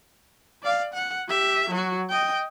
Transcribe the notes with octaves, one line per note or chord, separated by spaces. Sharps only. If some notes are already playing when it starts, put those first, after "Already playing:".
D5 F5
F#5
G4 E5
F#3 F#4
D#5 G5